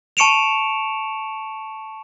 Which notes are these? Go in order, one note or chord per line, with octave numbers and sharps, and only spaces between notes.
A5 C#6 C#7 D7 E7 F7